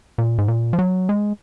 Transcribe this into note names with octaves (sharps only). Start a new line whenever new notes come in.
A#2
G#2
A#2
F3
F#3
G#3